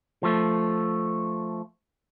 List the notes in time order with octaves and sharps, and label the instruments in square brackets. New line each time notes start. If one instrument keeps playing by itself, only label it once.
[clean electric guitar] F3 A3